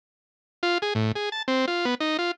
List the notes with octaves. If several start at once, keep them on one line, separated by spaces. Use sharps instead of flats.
F4
G#4
A2
G#4
A5
C4
F4
B3
D#4
F4